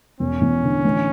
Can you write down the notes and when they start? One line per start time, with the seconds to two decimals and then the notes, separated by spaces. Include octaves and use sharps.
0.20 E1 C#4
0.41 E2
0.64 D3
0.85 A1